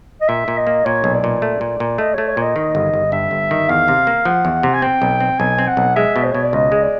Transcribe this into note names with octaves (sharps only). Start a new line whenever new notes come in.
D#5
A#2 E5
A#2
D#5
A#3
A#2 C#5
B1
D5
A#2
A3
A#2
A#2
A3 D#5
A3 C#5
C#5
A#2 D#5
D#3
G1
G1
G2 E5
G1
D#3
E2 F5
C3
A#3
F3 F#5
E2
C3
G#5
C4 G5
B1
C4
B1 G#5
C4
F#5
B1
G#3 E5
B2
C5
B2 C#5
D5
C#2 D#5
G#3
D5